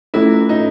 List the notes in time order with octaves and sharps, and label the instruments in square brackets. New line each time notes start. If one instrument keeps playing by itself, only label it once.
[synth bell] A3 C#4 F4 A4 [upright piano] E4
[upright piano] D#4